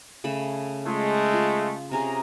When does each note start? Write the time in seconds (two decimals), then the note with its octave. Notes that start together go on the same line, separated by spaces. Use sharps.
0.24 C#3 A3 B5
0.86 G#3 A3 F4
1.34 F4
1.91 C3 C#4 G#4 A#5